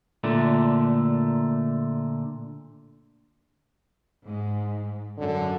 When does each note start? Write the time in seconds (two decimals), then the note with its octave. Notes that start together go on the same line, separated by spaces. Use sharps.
0.24 A#2 D3 A3
4.23 G#2
5.18 F#2 D3